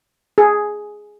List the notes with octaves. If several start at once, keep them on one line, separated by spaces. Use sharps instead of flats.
G#4